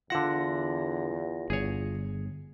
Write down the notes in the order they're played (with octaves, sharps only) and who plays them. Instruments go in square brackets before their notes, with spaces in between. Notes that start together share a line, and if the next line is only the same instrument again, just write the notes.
[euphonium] E2 [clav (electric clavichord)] D3 F#5 [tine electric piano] F4 A#6
[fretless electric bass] G1 [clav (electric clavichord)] G#4 C#5